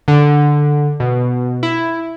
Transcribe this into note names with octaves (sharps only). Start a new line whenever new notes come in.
D3
B2
E4